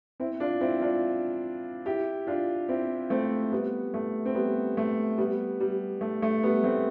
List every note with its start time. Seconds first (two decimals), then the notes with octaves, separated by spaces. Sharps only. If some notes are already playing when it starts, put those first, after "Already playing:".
0.20 C4 E4
0.40 D4 F4
0.61 C4 E4
0.81 D4 F4
1.86 E4 G4
2.27 D4 F4
2.69 C4 E4
3.10 A3 C4
3.52 G3 B3
3.94 A3
4.25 C4
4.35 G3 B3
4.77 A3
5.18 G3 B3
5.60 G3
6.01 A3
6.22 A3
6.43 G3 B3
6.64 A3 C4